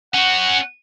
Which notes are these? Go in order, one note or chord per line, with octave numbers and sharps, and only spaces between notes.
C#4 F#4 F#5